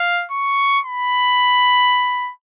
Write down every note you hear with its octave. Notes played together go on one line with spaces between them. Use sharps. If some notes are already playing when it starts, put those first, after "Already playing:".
Already playing: F5
C#6
B5